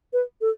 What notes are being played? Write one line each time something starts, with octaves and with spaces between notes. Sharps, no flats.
B4
A4